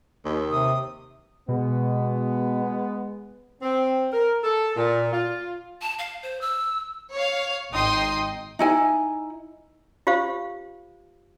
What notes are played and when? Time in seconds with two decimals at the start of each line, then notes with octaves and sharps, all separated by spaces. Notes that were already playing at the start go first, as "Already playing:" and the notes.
0.25 D#2
0.51 C3 D#6
1.49 B2 G#3 B3
3.62 C4
4.13 A#4
4.44 A4
4.76 A#2
5.13 F4
5.82 A5
5.99 F5
6.23 C5
6.41 E6
7.13 C#5 F5
7.74 G#1 D#4 D#5 G5 C6 D#6
8.59 D#4 E4 G#5
10.07 F4 G4 C5 F5